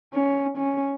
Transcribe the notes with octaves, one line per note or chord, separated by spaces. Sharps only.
C#4
C#4